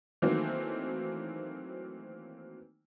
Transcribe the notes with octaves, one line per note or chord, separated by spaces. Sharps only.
D#3 E3 F#3 A3 A#3 C4